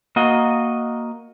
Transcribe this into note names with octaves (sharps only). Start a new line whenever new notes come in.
A#3 F#4 D#5